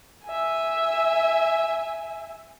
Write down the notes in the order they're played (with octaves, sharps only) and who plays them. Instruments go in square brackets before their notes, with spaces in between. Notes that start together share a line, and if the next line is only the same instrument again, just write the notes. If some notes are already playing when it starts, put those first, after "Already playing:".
[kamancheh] E5 G#5